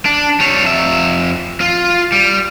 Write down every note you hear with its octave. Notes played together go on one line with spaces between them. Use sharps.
D4
G3 C#5
F2 E5
F4
G3